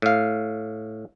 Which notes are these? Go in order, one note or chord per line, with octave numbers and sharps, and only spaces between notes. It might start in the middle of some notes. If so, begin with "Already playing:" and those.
A2 F5